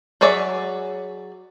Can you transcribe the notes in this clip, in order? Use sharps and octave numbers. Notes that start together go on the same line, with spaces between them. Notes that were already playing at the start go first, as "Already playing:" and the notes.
F#3 G#4 C#5 D5 E5